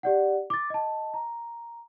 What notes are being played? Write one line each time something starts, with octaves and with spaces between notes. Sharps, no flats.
G4 D5 F#5
D6 A6
D#5 A5
A#5